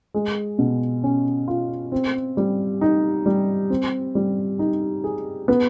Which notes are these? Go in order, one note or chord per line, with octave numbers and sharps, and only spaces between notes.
G#3
B2
C#4
F4
C4
G3
D#4
G3
C4
G3
D#4
G#4
B3